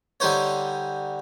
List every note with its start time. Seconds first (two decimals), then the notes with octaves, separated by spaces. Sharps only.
0.20 D3 G3 D#4 C5 C#5